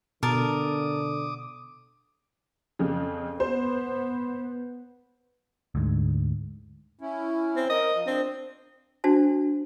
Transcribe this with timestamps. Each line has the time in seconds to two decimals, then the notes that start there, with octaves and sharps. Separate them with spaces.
0.23 B2 D3 A#4 A5 D6 D#6
2.79 F2 C#3
3.40 B3 C5
5.75 D2 G#2
7.01 C#4 E4
7.56 C4
7.70 A#4 D#5
7.95 F3
8.07 C4 D4
9.04 D4 F#4 C5 A5